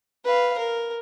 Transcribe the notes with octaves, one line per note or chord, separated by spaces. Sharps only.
B4 F5
A#4